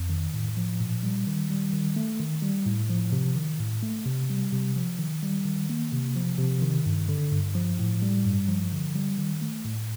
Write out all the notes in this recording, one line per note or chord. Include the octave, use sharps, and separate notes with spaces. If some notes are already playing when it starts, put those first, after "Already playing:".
Already playing: F2
D#3
A2
F3
A#2
G3
D#3
G3
D#3
A3
D#3
G3
A2
F3
C3
D#3
A2
A3
C3
G3
C3
F3
D#3
G3
D#3
A#3
C3
F3
C3
D#3
G2
D3
G2
F3
A2
G3
G2
F3
D3
G3
D#3
A3
A2